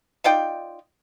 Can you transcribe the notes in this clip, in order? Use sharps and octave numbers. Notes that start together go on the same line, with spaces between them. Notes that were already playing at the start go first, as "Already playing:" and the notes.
D#4 F4 D5 G5